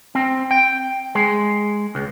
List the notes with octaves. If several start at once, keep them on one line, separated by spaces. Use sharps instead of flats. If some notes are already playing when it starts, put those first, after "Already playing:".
C4
G5
G#3
C#2